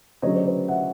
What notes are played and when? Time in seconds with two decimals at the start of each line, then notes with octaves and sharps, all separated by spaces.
0.22 D2 C#3 F#3 C#5 D#5
0.34 C5 D5
0.45 B4 C#5
0.68 E5 F#5